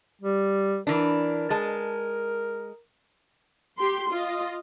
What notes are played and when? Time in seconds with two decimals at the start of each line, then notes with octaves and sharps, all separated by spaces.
0.21 G3
0.87 E3 D4 A#4
1.50 G#3 A5
3.77 G4 C6
4.10 F4 D#5